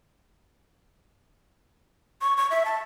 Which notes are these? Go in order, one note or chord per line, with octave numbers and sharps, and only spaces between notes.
C#6
C#6
E5
A5